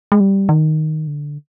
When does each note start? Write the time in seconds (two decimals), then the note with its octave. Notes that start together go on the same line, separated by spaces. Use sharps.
0.12 G#3
0.20 G3
0.49 D#3
1.07 D3